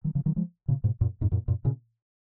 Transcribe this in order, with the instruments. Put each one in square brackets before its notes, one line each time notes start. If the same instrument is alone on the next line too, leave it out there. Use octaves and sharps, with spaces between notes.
[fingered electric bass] D#3 F#3
C#3 F3
D#3 F#3
F3 G#3
A#2 C#3
G#2 B2
F#2 A#2
F2 G#2
F#2 A#2
F#2 A#2
A#2 C#3